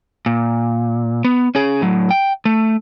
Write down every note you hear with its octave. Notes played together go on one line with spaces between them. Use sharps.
A#2
B3
C#4 G#4
A2 F#3
G5
A3